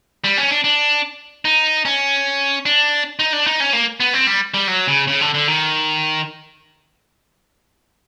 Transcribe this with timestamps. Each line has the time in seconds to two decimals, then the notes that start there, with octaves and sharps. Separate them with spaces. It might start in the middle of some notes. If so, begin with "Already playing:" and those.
0.24 G3
0.38 C#4
0.51 D4
0.64 D4
1.45 D#4
1.85 C#4
2.66 D4
3.19 D#4
3.33 D4
3.47 D#4
3.60 C#4
3.73 A#3
4.00 B3
4.13 C4
4.27 G3
4.54 G3
4.67 F#3
4.87 C#3
5.07 C#3
5.21 D3
5.34 D3
5.48 D#3